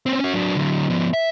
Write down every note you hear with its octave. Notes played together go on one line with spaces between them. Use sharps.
C4 C#4
C#4 F#4
F#3 D4
D3 F#3
F3 B3
E5